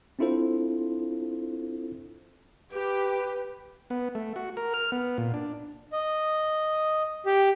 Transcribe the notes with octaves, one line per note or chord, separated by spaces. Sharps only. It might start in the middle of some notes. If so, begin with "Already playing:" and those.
C4 D4 E4 F4 A4 C5
G4 B4
B3
A3
F#4
A#4
F6
B3
A#2
D4
D#5
G4